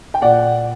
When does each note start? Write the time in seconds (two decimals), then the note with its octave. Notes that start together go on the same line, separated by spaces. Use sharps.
0.14 G5
0.22 A#2 D5 F#5